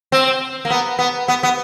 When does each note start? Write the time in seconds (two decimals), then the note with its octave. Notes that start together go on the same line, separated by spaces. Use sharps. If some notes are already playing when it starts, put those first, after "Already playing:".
0.12 C4
0.65 A#3
0.70 B3
0.99 B3
1.28 B3
1.43 B3